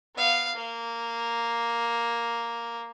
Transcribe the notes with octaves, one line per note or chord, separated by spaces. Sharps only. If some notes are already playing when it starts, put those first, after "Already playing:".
B3 F5
A#3